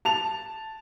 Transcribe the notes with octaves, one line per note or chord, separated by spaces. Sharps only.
A5 F7